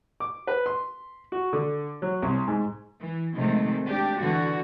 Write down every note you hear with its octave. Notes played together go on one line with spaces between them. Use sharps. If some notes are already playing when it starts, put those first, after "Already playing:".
D6
B4
C6
F#4
D3
F#3
C2
G#2
E3
C3 D#3 F3 G#3 A3
D4 G4
D3 E3 F#4